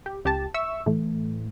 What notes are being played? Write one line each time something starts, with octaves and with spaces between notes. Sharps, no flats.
G4
C#2 G4 G5 A5 A6
E5 C#6 E6
A2 E3 A3